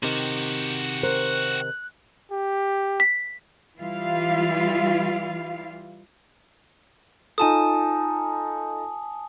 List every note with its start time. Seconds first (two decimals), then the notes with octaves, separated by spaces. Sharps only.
0.03 C3 D#3 F#4 G4
1.03 A#4 C5 F#6
2.31 G4
3.00 B6
3.78 E3 G3 E4 F4 F5
7.38 D#4 F4 A4 G#5 A5 D#6